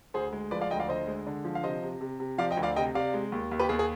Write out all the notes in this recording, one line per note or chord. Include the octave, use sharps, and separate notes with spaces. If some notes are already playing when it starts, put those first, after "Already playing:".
D2 G#4 C5
G#3
F3 B4 D5
D5 F5
D2 D#5 G5
D5 F5
D3 C5 D#5
G#3
D3
F3
F5
C3 C5 D#5
C3
C3
C3
F3 D5 F5
D#5 G5
D2
D5 F5
C3 D#5 G5
C3 D5 F5
G#3
D#2
D#2
G4 B4
D#2 G#4
G#4